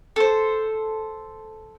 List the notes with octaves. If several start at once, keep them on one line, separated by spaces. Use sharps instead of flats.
A4 C5